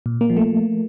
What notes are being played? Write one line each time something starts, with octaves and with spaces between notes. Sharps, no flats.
A#2
A#3
F3
A3